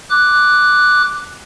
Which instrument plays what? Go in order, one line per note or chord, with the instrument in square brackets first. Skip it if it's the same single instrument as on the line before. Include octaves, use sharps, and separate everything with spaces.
[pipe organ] D6 F#6